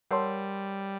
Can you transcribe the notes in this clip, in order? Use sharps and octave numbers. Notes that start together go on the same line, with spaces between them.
G3 A#4 C#5 F#5 A5 C6